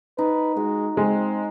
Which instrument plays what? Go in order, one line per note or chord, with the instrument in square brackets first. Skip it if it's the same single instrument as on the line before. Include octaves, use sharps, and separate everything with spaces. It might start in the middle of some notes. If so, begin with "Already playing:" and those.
[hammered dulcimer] D#4 [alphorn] B4
[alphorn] G#3 [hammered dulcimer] F#4
[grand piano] G#3 [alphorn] C4